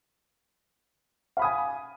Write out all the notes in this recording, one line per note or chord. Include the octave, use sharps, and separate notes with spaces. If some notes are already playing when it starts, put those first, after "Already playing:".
F5 G#5 B5 D#6